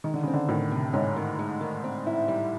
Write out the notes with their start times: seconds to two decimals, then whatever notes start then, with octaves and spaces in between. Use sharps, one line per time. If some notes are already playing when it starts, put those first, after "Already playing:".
0.04 D#3 G#3
0.14 D3
0.23 C#3 C4
0.33 D3
0.48 A2 D#3
0.72 C3
0.93 G#2 C#4
1.16 D#3
1.39 G#3
1.61 D#3
1.84 C4
2.06 E4
2.28 G3